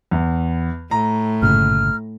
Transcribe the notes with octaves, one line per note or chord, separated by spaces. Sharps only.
E2
A2 A#5
G1 A#2 C#3 F6